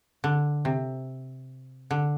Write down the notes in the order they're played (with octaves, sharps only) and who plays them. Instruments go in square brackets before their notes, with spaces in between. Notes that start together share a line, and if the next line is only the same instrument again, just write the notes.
[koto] D3
C3
D3